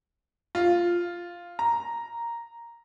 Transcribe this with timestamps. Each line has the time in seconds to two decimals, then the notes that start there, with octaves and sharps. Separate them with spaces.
0.55 F4
1.59 A#5